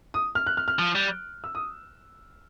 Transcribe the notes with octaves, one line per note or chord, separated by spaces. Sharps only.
D#6
F6
F#6
F6
F6
F3
G3
E6
D#6